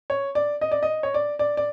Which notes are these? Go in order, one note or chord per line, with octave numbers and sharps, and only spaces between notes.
C#5
D5
D#5
D5
D#5
C#5
D5
D5
D5